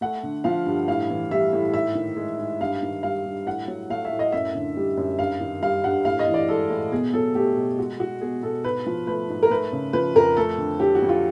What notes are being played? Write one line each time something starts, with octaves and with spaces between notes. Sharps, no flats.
A3 F#5
D3
F3 F5
G2
A2 F5
E3
G3 E5
A2
G#2 E5
D#3
G#3
G#2
G2 F5
D#3
G3 F5
G2
A2 F#5
F#3
A3 F5
E5
A2
D#5
F#2 E5
D3
G3
F#2
G2 F5
D#3
G3 F5
G2 F#5
A2 F5
D#5
E3
D5
G#3 A4
A2
B2 G#4
F#3 A4
A3 G4
B2
G#3 F#4
G#3 F#4
B2 G#4
B2 A4
G#2 B4
F3
A3 B4
G#2
A#4
A3 B4
C#3
F3 B4
F2 A#4
A3 A4
D3
F#3 G4
F#4
F2
F4